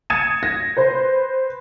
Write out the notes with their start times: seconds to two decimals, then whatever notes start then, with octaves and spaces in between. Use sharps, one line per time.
0.10 D#6 G#6 A6 C#7 D#7 E7
0.43 G#6 A#6
0.77 B4 C5